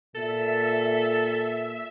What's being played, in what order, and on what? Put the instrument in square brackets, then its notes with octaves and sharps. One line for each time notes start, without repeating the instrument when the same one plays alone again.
[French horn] A#2 [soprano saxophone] A4 [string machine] E5